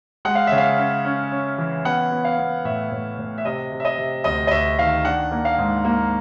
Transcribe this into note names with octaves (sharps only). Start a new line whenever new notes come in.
G#3 F#5
F5
C#3 E5
F5
C#4
C#4
C#4
E3
B3 F#5
B3
F5
B3
A2 E5
A2
A2
E5
C3 D#5
C3
E5
D#5
C3
D2 D#5
D#5
D2 E5
D#3 F5
D4 F#5
A#3
F5
G#2
A#3